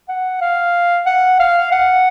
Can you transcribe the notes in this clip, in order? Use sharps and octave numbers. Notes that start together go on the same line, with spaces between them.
F#5
F5
F#5
F5
F#5